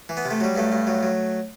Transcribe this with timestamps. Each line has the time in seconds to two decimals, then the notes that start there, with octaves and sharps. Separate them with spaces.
0.09 E3
0.17 B3
0.25 C3
0.31 A3
0.40 F#3 G3
0.56 G2 A3
0.72 G2
0.87 F#3
1.03 F#3